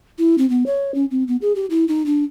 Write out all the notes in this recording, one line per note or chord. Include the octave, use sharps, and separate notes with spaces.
E4
C4
B3
C#5
C#4
C4
B3
G#4
G4
E4
D#4
D4